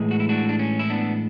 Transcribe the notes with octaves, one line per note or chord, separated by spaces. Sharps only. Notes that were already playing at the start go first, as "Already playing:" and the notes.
Already playing: A2 E3 G#3
F#4
E4
D4 F#4
D4
C#4
E4
B3 D4